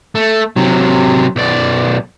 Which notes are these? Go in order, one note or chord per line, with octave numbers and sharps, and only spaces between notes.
A3
C3 F#3
B1 D5